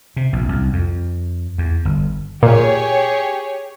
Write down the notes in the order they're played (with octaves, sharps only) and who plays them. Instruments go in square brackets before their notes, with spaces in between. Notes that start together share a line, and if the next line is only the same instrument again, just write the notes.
[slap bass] C3
A#1
C2
F2
E2
G1
[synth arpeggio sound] A#2 [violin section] G4 G#4 C#5